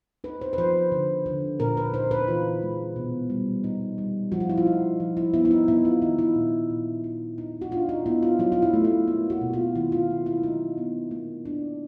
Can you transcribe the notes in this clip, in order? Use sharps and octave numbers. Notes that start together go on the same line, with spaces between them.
D#4 B4
C5
B4
F3 C5
D3
D3
A#2 A#4
B4
D#4 C5
B4
E3 F4
G#3
B2
G3
D#4
G3
F3 F#4
F4
E4
F4
D#4
F3
E4
B3 E4
E4
D#4
B3 E4
F4
D#3 D#4
E4
A#2
A#2
D#4
D#4
F#4
D4 F4
D#4
B3 E4
F4
F#3 F4
F4
E4
A3
E4
A#3
F#4
B2
F4
D#3 E4
F4
A#3
E4
F#3 D#4
B3
A#3
D4